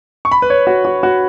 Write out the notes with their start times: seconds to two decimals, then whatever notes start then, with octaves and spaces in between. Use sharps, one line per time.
0.25 C#6
0.32 B5
0.42 B4
0.50 C#5
0.67 F#4
0.85 F#4
1.03 F#4